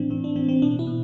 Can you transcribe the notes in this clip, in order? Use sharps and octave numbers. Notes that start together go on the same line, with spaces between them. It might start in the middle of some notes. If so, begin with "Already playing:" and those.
Already playing: A2 E3 C4 D4
A2 C4
D4
E3 C4
C4
B2 D4
E4
B2